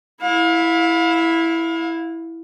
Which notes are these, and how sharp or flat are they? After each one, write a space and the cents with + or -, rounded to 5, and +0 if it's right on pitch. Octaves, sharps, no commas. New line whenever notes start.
E4 +0 F5 +30